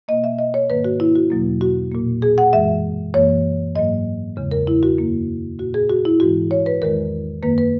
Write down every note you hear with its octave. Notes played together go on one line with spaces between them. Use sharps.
B2 A#3 D#5
E5
D#5
C#5
G#2 D#3 A#3 B4
F#4
E4
F#4
E2 B2 F#3 A#3
F#4
A#2 A#3
G#4
F#5
F#2 E3 G#3 E5
F#2 E3 A#3 C#5
G#2 F#3 A#3 D#5
E2 C#3 G#3
A#4
E4
F#4
F#2 D#3 A#3
A#2 A#3 F#4
G#4
F#4
E4
G#2 E3 G#3 F#4
C#5
B4
E2 D#3 G#3 A#4
F#2 D#3 A#3 B4
B4